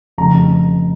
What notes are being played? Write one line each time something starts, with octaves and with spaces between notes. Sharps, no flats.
F1 F2 C#3 A#5